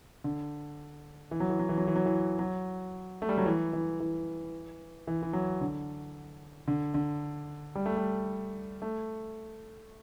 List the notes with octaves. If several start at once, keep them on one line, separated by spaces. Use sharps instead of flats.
D3
E3
F#3
E3
F#3
E3
F#3
E3
F#3
E3
F#3
A3
G3
F#3
E3
E3
E3
E3
E3
F#3
D3
D3
D3
G3
A3
G3
A3